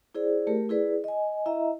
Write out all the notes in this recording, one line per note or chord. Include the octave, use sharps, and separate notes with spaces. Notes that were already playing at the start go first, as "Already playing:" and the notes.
E4 G#4 C5 D5
A3 G4 A#4
E4 G#4 B4 D5
D#5 G#5
E4 D#5 E5 A#5